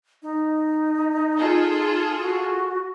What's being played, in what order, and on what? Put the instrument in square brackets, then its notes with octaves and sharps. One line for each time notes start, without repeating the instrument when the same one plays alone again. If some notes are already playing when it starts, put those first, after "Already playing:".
[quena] D#4
[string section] F4 G#4 A4
[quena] F#4